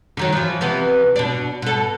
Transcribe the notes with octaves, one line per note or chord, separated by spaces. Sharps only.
D3 D#3 F#3
E3 F3
C3 E3 B3
B2 D4
B2 A4